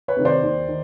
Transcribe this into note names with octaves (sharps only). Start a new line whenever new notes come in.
B4 C#5
C3 D#3
C5 D5
D#2
D#3